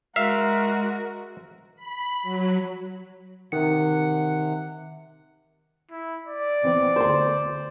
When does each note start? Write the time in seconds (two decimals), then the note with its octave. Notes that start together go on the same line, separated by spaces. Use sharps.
0.16 G#3 F#4 A#4 E5 F5
1.76 B5
2.23 F#3
3.52 C3 D#3 F#5 C#7
5.91 E4
6.26 D5
6.63 E3 B3 C4
6.96 D2 C5 C6